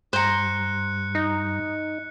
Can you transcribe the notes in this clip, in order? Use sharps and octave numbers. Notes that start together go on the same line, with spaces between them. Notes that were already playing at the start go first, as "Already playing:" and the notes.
G2 C5 A#5 F#6 C#7
D#4